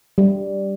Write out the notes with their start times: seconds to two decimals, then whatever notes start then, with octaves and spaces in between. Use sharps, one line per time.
0.18 G3